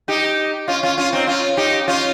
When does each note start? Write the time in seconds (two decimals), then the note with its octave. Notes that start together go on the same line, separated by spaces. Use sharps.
0.08 D#4 G4
0.68 C#4 F4
0.83 C#4 F4
0.98 C#4 F4
1.13 C4 D#4
1.27 C#4 F4
1.57 D#4 G4
1.88 C#4 F4